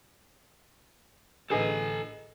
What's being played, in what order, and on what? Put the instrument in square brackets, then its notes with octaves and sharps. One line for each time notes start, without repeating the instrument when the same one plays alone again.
[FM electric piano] A1 D3 [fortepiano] G#4 B4 D#5 [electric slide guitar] A4 G#5